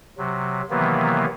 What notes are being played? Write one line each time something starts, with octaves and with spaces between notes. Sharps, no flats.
C3 F#3
C3 D#3 E3 F#3 A#3 B3